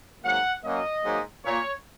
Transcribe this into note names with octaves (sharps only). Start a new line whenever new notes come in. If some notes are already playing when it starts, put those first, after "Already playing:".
G#2 F#3 A#3 F#5
F#2 F#3 A#3 D#5
G#2 F#3 A#3
A#2 A#3 C#5